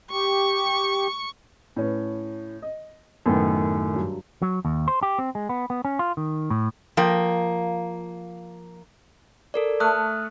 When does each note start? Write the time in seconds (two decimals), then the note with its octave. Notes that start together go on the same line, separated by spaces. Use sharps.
0.11 G4 C#6
1.76 A2 C#4 B4
2.62 D#5
3.26 F#2 A2 D#3 B3 G5
3.93 G2 F#3
4.42 F#3
4.65 D#2
4.88 C5
5.03 G4
5.19 C4
5.35 G#3
5.49 B3
5.70 B3
5.85 C#4
5.99 F4
6.17 D#3
6.50 A2
6.97 F3 A#3 G5
9.54 A4 A#4 D5
9.80 A3 D#6 F6 F#6